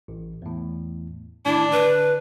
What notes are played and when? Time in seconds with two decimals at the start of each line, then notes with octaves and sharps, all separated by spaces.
0.08 A1
0.42 E2 A2
1.45 A2 D#3 D4 E4
1.72 D3 B4